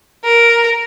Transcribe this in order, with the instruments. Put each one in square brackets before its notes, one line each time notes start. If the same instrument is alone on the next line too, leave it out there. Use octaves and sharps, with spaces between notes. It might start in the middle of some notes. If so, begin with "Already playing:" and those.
[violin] A#4